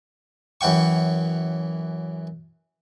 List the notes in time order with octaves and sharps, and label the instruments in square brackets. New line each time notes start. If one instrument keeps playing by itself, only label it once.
[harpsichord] F#2 E3 F#5 G5 C#6